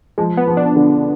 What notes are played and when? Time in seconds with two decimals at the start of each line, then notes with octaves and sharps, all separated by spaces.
0.18 F3 G#3
0.37 B3
0.47 F3
0.57 D4
0.76 D3